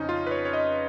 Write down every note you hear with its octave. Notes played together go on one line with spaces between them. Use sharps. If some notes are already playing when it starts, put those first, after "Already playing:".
Already playing: F2 C#3 F3 C#4 D#4
F4
B4
C#5
C#5
D#5